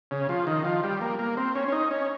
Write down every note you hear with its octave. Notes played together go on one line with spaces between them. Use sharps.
C#3
F3
D#3
F3
G3
A#3
A#3
C4
C#4
C#4
D#4
C#4